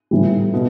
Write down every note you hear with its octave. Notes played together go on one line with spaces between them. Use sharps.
A2 E3 G3
B2